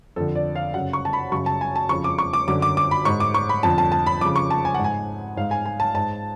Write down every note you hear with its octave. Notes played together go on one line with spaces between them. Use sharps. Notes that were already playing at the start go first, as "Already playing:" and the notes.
F2 D3 A4
D5
F5
F#2 C#3 F#5
C#6
A5
B5
F#2 C#3 C#6
A5
G#5
A5
F2 C#3 C#6
D6
C#6
D6
F#2 D3 D6
D6
D6
B5
G#2 C#6
D6
C#6
B5
F2 D3 A5
A5
A5
B5
F2 C#3 D6
C#6
A5
G#5
F#5
G#2
G#5
G#2 F5
G#5
G#5
A5
G#2 A5